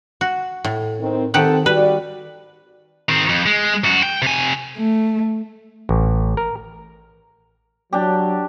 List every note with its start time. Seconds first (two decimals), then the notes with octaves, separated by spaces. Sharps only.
0.21 F#4
0.64 A2
1.00 D#3 C4
1.34 D#3 C4 G4 A4 F#5
1.66 G3 F#4 B4 D5
3.09 D#3 C4
3.29 F2
3.46 G#3
3.84 F#2 F#4
4.03 G5
4.22 C3 G#5
4.78 A3
5.89 A1
6.37 A#4
7.93 F#3 D4 G4